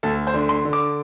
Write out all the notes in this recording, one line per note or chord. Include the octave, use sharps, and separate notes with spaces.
D2 A4
C5
D3
C6
D3
D6